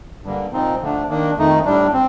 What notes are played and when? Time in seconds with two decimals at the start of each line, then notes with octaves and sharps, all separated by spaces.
0.24 G2 D3 G3 A#3
0.53 A#2 F3 C4 D#4
0.80 D3 F3 A3 D4
1.09 D#3 A#3 D4
1.37 F2 D#3 A3 D#4
1.65 A2 G3 D4
1.93 C4